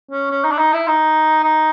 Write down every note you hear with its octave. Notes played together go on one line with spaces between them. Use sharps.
C#4
C#4
D#4
D4
D#4
E4
D#4
D#4